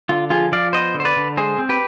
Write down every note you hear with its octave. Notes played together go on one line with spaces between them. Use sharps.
D3 F4
F3 F4 G#4
F3 D5 F5
B3 C5 D#5
D3
C5
B4 D5
D3
G#3 G#4 C5
C4
G4 B4